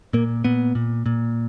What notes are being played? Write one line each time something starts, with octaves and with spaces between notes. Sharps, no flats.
A#2 A#3
A#2 B3
A#2
A#2